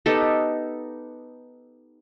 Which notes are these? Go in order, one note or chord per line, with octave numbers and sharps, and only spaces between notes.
B3 D#4 G4 A4